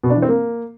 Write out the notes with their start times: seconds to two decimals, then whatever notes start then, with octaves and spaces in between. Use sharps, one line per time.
0.04 B2
0.10 D4
0.16 E3
0.22 C4
0.29 A#3